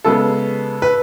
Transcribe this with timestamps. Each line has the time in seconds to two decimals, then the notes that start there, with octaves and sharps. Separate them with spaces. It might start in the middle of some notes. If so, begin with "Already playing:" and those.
0.04 C#3 G#3 B3 A4
0.82 B4